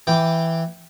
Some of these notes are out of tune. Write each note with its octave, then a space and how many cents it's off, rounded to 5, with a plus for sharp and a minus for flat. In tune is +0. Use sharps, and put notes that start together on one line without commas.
E3 +0 G5 +0 D6 +0